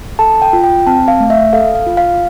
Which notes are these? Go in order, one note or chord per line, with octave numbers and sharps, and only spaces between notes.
A4 A5
G5
F4
G5
C4 A5
F5
A3
E5
A4 F5
F5
F4
F5